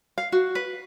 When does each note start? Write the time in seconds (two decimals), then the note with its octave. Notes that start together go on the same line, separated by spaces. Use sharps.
0.18 F5
0.32 F#4
0.55 B4